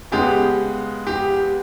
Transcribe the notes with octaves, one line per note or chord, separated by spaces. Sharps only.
C#3 G#3 B3 G4
G4